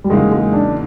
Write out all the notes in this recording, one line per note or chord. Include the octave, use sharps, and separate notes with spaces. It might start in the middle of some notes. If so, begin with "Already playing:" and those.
G3
E2 C#3 F#3 G#3 A#3 D#4
G#3
D4